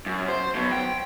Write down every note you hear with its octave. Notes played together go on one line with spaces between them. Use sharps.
F#2
C5
F#3 B3
G5